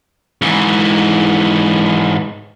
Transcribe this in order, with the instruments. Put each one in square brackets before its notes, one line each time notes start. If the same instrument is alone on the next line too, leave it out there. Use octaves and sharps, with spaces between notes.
[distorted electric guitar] G#2 E3